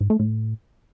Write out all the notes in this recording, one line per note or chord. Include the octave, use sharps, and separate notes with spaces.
G#2
A3
A2